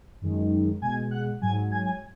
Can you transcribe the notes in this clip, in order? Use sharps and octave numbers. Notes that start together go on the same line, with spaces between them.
F#2 D#3 G#3
B2 G#3 G#5 G#6
F#5 F#6
G#2 F#3 G#5 G#6
G#5 G#6
G#5 G#6